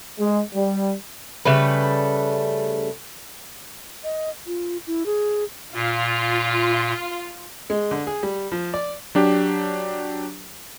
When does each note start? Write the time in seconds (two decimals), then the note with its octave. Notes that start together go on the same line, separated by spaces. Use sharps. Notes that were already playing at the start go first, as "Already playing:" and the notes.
0.18 G#3
0.54 G3
1.45 C#3 G3 A3 B4
4.04 D#5
4.47 F4
4.87 E4
5.06 G#4
5.74 A#2 F4
7.70 G#3
7.91 D3
8.07 G#4
8.23 G3
8.52 F3
8.74 D5
9.15 F#3 D4 G4